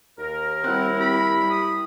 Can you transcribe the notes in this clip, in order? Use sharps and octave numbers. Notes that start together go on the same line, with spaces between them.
D#2 A#4
G3 C4 E4 F#5
G4 B5
D#6